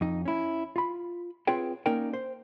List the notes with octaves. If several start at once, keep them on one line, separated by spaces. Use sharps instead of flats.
F2 D#4
C#4 E4
F4 B5
C4 F4 G#4 B4 C#5 G5
A#3 C#4 D#4 A#4 D5 G5
C5